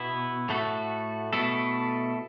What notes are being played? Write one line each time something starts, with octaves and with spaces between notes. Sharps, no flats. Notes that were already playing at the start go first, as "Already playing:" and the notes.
Already playing: B2 B3 E4
A2 A3 F#4 A4
B2 A3 E4 A4